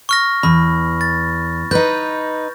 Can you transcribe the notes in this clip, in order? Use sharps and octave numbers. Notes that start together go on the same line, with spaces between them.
C#6 F6 A#6
E2 B5
A6
D#4 B4 G6